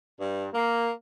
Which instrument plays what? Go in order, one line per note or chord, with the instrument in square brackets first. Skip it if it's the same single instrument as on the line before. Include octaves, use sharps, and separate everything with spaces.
[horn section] G2
A#3